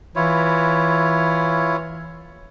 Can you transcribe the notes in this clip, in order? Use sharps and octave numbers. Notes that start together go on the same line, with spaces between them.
E3 E4 F4 C#5